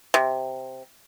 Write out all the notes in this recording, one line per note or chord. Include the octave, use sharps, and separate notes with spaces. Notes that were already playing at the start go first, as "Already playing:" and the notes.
C3